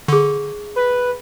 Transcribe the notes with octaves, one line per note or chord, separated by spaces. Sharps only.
D3 G#4 C#6
B4